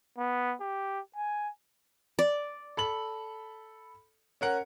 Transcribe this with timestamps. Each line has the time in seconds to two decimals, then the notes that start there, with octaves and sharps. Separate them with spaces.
0.18 B3
0.61 G4
1.16 G#5
2.19 D5
2.77 A4 B5 F#7
4.41 C#4 A#4 F#5